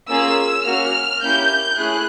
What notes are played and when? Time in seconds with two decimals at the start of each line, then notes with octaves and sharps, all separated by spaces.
0.09 A#3 C#4 F4 G#4 E6
0.65 A#3 C#4 F#4 F6
1.22 A#3 C#4 E4 G4 G6
1.78 A3 C#4 E4 G#4 F#6